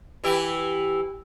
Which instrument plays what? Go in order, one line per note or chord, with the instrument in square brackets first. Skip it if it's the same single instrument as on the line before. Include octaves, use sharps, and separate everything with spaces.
[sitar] E3 E4 G4